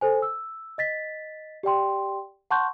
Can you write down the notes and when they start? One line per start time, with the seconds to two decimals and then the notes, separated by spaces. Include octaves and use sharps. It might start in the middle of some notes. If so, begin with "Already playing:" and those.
0.01 A4 C5 G#5
0.22 E6
0.78 D#5 A6 B6
1.63 G4 D5 G5 C6
2.51 F#5 A5 C6 C#6 F#6 G6